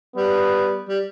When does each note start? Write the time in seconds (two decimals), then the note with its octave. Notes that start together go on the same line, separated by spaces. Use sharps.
0.16 G3 B3
0.88 G3